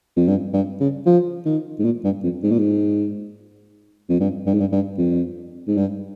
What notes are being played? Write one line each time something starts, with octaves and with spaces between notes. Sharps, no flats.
F2
G2
G2
C#3
F3
D#3
G#2
A#2
G2
F2
G#2
A#2
G#2
F2
G2
G2
G#2
G2
G2
F2
G#2
G2